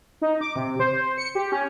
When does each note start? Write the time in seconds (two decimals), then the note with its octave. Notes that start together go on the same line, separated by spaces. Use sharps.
0.22 D#4
0.41 D6
0.56 C3
0.79 C5
1.18 C#7
1.35 G4
1.52 C#4